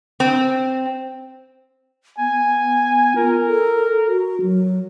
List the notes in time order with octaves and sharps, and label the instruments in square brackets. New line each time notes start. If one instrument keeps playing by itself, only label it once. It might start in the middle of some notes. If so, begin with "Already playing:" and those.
[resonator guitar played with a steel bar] C4
[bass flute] B3 [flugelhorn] G#5
[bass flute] F4 [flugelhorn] A#4
[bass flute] A4
F#4
F#3